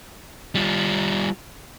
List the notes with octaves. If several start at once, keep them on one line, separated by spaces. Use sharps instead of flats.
G3 F4